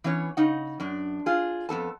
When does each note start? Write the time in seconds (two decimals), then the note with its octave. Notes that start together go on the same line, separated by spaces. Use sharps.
0.04 E3 B3 C#4 C#5
0.37 C#3 D#4 F#5
0.80 F#2 D4
1.26 F4 G#4
1.69 F2 B3 A4 A5